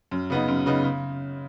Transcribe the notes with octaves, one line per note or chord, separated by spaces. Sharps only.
F#2
C#3 B3 D#4
F#2
C#3 B3 D#4
C#3